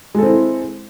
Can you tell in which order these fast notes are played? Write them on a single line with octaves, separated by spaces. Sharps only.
G#3 A4 C4 E4